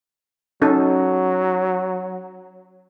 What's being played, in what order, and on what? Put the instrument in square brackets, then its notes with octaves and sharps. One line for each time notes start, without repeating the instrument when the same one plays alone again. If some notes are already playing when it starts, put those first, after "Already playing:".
[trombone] F#3 [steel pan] C#4 D#4 A4